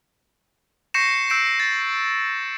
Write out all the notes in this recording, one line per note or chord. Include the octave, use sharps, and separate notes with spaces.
C#6 G6 A#6 C7 C#7 E7
E6 G6 C7 D7 E7
A6